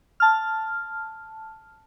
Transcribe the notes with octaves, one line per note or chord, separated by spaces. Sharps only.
A5 F6